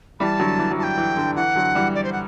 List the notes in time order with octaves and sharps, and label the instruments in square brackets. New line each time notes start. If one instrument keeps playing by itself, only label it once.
[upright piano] E3 G3 [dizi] A5 B5
[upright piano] D3 F#3
E3
F#3
[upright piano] E3 [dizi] A5
[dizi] G5
[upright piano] E3
D3
[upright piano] E3 [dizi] F#5
[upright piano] D3 F#3
E3 G3
[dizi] D5
C5
F#5